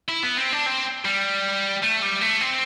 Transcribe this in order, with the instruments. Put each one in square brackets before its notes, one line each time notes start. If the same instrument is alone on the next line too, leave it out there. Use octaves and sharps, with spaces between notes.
[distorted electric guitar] E4
B3
C4
D4
C4
G3
A3
G3
A3
C4